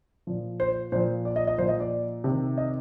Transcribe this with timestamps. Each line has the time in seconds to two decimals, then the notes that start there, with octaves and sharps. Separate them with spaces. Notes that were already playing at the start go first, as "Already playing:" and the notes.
0.27 A#2 F3
0.60 C5
0.92 A#2 F3 C5
1.25 D5
1.36 D#5
1.47 D#5
1.58 A#2 F3 C5
1.69 D#5
1.80 D5
2.24 C3 D#3
2.57 D#5